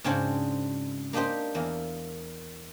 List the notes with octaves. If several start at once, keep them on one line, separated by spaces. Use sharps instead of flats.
G#2 C#3 C4 D4 F#4 C5
A#3 D4 D#4 G4 C5
E2 A#3